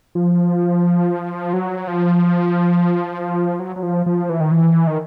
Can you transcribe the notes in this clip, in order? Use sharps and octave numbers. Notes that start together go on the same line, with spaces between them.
F3
F#3
F3
F#3
F#3
F3
F3
E3
D#3
E3
D#3